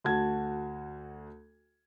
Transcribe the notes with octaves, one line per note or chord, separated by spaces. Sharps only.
D2 F#4 A5 G#6